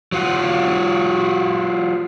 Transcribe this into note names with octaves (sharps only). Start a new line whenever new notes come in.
F#3 F4 F#4